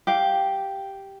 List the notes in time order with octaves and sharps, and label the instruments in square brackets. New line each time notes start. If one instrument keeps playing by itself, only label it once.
[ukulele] G4 F5